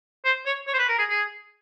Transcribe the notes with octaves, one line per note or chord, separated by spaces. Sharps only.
C5
C#5
C#5
C5
B4
A#4
G#4
G#4